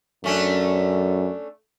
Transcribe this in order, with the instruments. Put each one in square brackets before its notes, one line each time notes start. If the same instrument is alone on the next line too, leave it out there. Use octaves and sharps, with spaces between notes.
[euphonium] F#2 [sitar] A3 C#4 D4